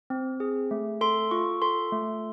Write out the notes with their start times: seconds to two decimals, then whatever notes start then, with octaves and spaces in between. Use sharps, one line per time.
0.10 C4
0.40 G#4
0.71 A3
1.01 A4 C6
1.31 F4 C#6
1.62 A4 C6
1.92 A3